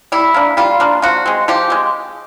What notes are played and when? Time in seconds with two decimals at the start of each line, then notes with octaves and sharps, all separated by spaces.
0.12 G3 E4
0.34 A#3 D4
0.57 G3 F4
0.80 A#3 D4
1.02 F3 F#4
1.26 G#3 C4
1.48 F3 G4
1.70 G#3 C4